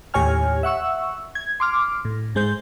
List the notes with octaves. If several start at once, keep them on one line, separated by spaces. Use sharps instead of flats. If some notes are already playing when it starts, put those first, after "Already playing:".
D#2 A2 G4 C#5 G#5 F6
E5 F#5 C#6 E6
G#6
C6 D6 F6
A2
G#2 G#3 C5 G6